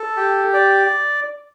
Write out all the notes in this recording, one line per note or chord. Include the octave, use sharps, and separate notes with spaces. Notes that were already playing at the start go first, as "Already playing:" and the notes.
Already playing: A4
G4
D5